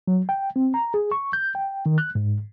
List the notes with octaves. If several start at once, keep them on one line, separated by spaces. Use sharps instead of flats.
F#3
G5
C4
A#5
G#4
C#6
G6
G5
D#3
F#6
G#2